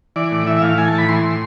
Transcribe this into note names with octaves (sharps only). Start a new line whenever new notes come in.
E3 D5
A2
E3 E5
E5
A2 F5
E3 G#5
A5
A2
B5
E3 C6
A2